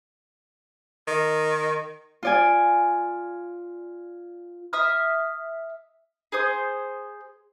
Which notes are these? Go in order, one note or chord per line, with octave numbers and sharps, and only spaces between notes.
D#3
F4 D5 G#5
E5 D#6 F6
G#4 C5 D#6